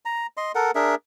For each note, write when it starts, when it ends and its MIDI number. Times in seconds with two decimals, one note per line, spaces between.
0.05 0.27 82
0.37 0.52 75
0.37 0.52 84
0.55 0.71 69
0.55 0.71 70
0.55 0.71 78
0.75 0.95 62
0.75 0.95 68
0.75 0.95 70
0.75 0.95 76